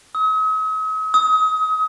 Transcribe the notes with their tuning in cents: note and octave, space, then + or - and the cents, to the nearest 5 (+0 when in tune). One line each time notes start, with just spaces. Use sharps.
D#6 +45
D#6 +30